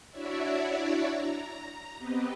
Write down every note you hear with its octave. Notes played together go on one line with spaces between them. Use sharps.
D4 E4 F#4 C#5 D5 E5
A#5
B3 C4 G4 B4 D#5